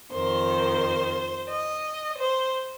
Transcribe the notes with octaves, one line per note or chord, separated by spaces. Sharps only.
F2 D#3 C5
D#5
C5